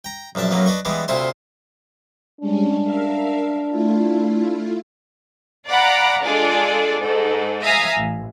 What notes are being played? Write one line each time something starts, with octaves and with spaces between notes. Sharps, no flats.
G5 A#5
A#1 F#2 D4 E5 A5
F#2 A2 F#3 A#3 B3
D4 B4 D#5 C#6
E3 G3 G#3 B3 D4
D2 C3 E4 F4 C5 C6
G3 G#3 C#4 D4
A#4 E5 F5
A3 E4 F4
D5 F5 F#5 A#5 B5 D6
G#3 D4 F4 G#4 A4 D5
G#2 A4
E5 F5 G#5 A#5 D#6
A1